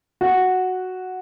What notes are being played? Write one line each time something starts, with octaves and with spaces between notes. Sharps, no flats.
F#4